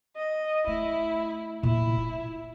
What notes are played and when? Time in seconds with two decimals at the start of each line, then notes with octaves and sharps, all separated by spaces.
0.16 D#5
0.67 A3 E4
1.63 A#2 E4
1.97 F4